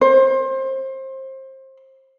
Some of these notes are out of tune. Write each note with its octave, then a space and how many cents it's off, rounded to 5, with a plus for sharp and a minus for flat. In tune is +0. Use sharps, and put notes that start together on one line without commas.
C5 +25